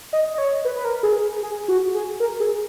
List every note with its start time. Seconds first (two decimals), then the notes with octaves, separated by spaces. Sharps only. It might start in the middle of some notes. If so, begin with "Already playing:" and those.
0.13 D#5
0.33 D#5
0.38 C#5
0.65 B4
0.76 B4
0.85 A#4
1.03 G#4
1.42 G#4
1.68 F#4
1.95 G#4
2.20 A#4
2.40 G#4